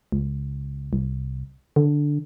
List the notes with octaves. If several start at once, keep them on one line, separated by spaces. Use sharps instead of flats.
C#2
C2
D3